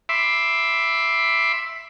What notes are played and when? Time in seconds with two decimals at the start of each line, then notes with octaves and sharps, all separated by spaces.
0.09 E5 B5 C6 D6